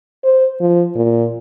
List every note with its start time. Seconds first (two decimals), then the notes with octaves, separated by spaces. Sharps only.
0.24 C5
0.60 F3
0.95 A#2